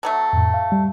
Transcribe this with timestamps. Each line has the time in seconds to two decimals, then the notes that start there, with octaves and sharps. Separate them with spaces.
0.03 D3 F#3 A3
0.33 F2 A2
0.54 F5
0.72 G3